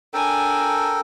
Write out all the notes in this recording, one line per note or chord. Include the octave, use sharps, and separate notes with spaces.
D4 A4 A#4 G5 G#5